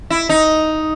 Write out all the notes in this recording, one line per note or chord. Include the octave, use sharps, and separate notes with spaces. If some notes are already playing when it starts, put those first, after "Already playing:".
E4
D#4